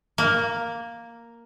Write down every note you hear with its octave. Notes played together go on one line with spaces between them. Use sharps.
A#3